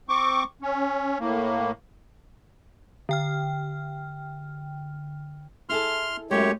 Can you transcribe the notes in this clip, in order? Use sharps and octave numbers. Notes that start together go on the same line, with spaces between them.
C4 C#6 D6
C#4
A2 A#3
D3 G5 F6
E4 G#4 A4 C6 F6
F#2 G#3 A3 G4 C#5